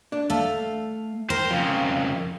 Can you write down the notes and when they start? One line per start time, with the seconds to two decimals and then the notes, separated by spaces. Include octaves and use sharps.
0.12 D4
0.30 A3 A4 F5
1.30 A#4 C5 G5
1.51 F2 C#3 F3